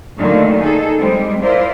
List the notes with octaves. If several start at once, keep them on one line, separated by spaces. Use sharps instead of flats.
A#2 D3 D#3 F#3 A3 A#3
D#4 G#4 A4
G3 G#3 C4
E4 F4 A#4 C5 D5